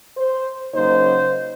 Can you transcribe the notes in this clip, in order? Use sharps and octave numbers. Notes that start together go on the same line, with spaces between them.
C5
C#3 F#3 A#3 D#4 C5